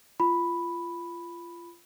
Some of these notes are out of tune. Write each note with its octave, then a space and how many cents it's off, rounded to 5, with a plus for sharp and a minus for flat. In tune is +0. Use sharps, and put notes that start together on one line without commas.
F4 -20 B5 +0